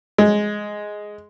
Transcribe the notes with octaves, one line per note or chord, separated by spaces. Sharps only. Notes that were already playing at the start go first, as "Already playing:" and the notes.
G#3